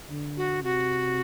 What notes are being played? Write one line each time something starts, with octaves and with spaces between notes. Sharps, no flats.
D3
F#4
C3 F#4